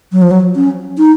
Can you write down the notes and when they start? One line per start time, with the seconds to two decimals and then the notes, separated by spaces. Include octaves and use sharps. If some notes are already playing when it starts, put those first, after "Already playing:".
0.12 F#3
0.22 F3
0.31 F#3
0.56 C#4
0.98 D#4